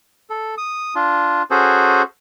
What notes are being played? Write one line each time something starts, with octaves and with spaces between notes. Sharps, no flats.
A4
D#6
D4 F4
C#4 F#4 G#4 A4 C5